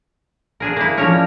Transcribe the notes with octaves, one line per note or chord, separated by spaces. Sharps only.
D4 G#4 A#4
A#3 E4
F3 C#4 D4 A#4 C#5 A#5